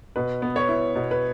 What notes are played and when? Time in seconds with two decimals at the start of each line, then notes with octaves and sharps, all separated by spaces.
0.16 B2 B4
0.42 B3
0.56 C#5
0.69 E4
0.95 B2
1.11 B4